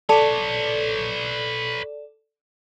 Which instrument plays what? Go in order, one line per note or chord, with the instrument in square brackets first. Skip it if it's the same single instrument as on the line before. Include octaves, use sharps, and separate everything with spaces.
[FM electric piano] A4 D5 [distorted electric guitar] B4 C#5 [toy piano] A5